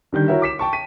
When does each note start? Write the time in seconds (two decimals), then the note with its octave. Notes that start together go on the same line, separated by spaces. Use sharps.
0.12 D3 D#3 G3 G6
0.28 E4 F#4 A#4 C#5 E5
0.42 D6 B6 E7
0.59 G5 A5 C#6
0.73 B6 D#7